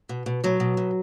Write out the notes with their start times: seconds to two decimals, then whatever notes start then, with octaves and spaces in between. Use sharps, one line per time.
0.09 B2
0.26 B2
0.44 B2 F#3
0.60 B2
0.77 B2